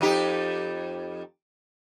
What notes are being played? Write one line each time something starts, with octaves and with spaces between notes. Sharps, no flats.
F2 D#4 G4